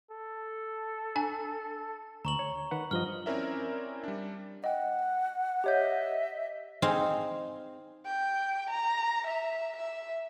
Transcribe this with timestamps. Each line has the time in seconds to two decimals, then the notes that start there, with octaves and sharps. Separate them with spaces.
0.11 A4
1.16 D4 G#5
2.25 D2 A#5 C#6 F#7
2.39 C#5
2.71 D#3 B4 F#5
2.91 G2 F3 D#5 F6 G7
3.26 C4 C#4 E4 A#4 D5 E5
4.04 G3 D4
4.64 D#5 F#5 G5
5.64 G4 C#5 D#5 E5 G6
6.82 C4 D#4 G#4 F5
8.06 G5
8.70 A#5
9.27 E5
9.76 E5